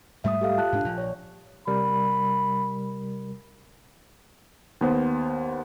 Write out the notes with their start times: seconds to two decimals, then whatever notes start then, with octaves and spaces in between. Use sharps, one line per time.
0.24 G#2 G3 A3 E5 D#6
0.41 G4 A4 F5
0.57 F4 A5 F#6
0.72 G#2 D4
0.84 A#1
0.98 C#5 D5
1.67 C3 G3 A#4 B5
4.81 D#2 B3 C5